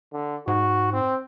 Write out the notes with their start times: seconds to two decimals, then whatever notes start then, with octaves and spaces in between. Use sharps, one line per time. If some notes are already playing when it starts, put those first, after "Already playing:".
0.12 D3
0.48 G#2 F#4
0.93 C4